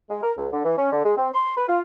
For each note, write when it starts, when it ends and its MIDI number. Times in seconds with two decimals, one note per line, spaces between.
0.10 0.22 56
0.23 0.32 70
0.38 0.48 37
0.52 0.61 50
0.64 0.75 52
0.78 0.91 61
0.92 1.03 50
1.05 1.14 56
1.18 1.28 60
1.34 1.53 84
1.57 1.68 71
1.69 1.81 65